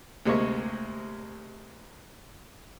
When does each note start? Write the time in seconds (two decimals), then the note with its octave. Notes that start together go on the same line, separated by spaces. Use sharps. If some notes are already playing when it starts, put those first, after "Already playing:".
0.26 D2 C3 G#3 A#3 C#6